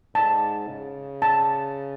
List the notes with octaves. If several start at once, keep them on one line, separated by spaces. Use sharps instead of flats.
G#2 A5
C#3
A5